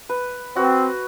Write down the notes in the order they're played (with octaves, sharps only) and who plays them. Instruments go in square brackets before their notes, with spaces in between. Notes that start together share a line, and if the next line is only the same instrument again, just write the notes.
[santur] B4
[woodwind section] C4 [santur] F#4 B4